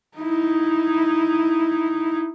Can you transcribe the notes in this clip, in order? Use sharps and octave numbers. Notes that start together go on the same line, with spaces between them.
D#4 E4